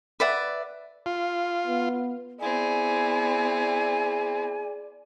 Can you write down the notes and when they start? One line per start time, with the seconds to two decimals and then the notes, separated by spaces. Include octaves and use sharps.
0.20 B4 D5 E5 F#5
1.06 F4
1.67 B3
2.41 B3 C4 E4 G#4 D5 G#5